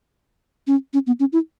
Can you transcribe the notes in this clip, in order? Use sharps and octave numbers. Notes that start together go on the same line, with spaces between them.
C#4
C#4
B3
C#4
E4